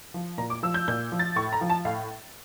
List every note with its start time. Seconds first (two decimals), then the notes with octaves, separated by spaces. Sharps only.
0.14 F3
0.38 A#2 A#5
0.50 D6
0.63 F3 E6
0.74 G6
0.88 A#2 G6
1.12 F3
1.19 A6
1.36 A2 C#6
1.53 A#5
1.61 F3
1.70 A5
1.85 A2 F5